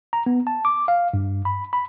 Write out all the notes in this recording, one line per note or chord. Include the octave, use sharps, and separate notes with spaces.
A#5
B3
A5
D6
F5
G2
B5
B5